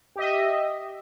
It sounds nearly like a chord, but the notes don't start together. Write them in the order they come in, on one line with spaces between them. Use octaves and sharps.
G4 D#5 E5